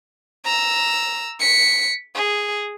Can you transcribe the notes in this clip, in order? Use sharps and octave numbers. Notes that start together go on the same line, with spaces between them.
A#5 E6
B6 C#7
G#4